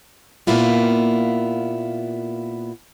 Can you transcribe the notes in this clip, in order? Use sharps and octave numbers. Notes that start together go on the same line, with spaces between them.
A#2 A#3 B3 E4 F4 G4